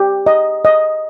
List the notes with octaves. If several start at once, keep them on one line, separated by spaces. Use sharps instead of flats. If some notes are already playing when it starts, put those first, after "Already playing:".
Already playing: G4
D#5
D#5